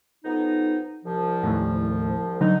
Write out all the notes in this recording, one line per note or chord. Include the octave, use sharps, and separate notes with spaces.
F2 B3 D#4
C2 F3
A1 D#2 A2
D3 F#3 D#4